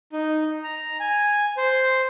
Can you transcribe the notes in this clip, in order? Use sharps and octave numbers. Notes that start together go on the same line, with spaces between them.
D#4
A#5
G#5
C5